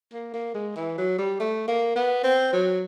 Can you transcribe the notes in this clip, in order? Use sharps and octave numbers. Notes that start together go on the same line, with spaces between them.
A#3
A#3
G#3
E3
F#3
G3
A3
A#3
B3
C4
F#3